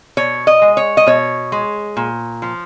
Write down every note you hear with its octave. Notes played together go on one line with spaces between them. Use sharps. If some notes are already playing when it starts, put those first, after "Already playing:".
B2 C#5
D#5
G#3
C#5
D#5
B2 C#5
G#3
A#2
F3